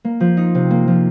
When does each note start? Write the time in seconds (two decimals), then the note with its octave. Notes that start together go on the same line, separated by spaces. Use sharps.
0.05 A#3
0.20 F3
0.37 D#4
0.55 C3
0.71 A#3
0.88 F3